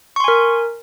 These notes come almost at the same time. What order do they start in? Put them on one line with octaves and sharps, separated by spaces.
C#6 C6 G#5 A#4